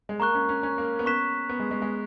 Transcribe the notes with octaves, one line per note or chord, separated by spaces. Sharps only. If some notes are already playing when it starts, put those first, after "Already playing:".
G#3
A#3 A#5 C#6 F#6
C#4
C#4
C#4
A#3
B3
C#4 C#6 F#6 B6 E7
B3
G#3
G#3
G#3